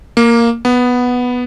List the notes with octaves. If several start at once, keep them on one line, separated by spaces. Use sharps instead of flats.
A#3
B3